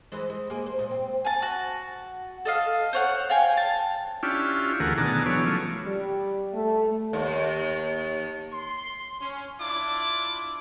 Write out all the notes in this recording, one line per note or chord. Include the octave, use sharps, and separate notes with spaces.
E3 G#3 C5
G#3
A#3 G#4
C5
A#2 G#3
C4
G#5 A5
F#4
A4 D#5 F5
C5 C#5 F#5
F5 G5 G#5
A5
C#4 D4 E4 F4 G4
D2 E3 A3 G#4 A#4 F#5
B2 D#3 D4 G#4 A5 A#5
E3 F#3 B3 G#4 C#5 D6
F3 A3 C#4
G3
A3
D#2
C6
C#4
D4 E4 F4 D6